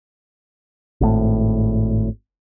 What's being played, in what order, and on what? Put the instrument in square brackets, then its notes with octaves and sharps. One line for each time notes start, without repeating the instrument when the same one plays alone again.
[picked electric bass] G#1 A2